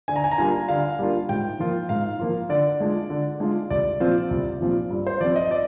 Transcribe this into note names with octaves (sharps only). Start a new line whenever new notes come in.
D3 G#5
A#5
G#5
A#5
G3 A#3 D4 F4 G#5
D3 F5
G3 A#3 D4 F4
G#2 G5
F3 A#3 F4
G#2 F5
F3 A#3 F4
D3 D5
G#3 D4 F4
D3
G#3 D4 F4
C2 D5
A#2 F3 C4 F4
C2
A#2 F3 C4 F4
G2
C5
F3 C4 D5
D#5
D5